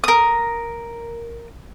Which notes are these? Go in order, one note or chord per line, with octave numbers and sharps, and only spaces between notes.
A#4 D#6